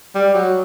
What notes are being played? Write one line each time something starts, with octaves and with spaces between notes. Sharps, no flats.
G3
F#3